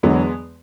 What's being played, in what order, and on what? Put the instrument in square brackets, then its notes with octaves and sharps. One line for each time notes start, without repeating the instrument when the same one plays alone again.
[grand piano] E2 D3 F#3 [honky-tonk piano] G#3 B3